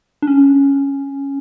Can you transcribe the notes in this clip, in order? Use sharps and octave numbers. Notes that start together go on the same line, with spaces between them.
D4
C#4